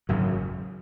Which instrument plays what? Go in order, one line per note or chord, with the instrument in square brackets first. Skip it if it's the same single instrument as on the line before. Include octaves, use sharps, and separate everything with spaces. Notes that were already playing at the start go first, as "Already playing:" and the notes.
[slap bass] G#1 F#2 C#3 F#3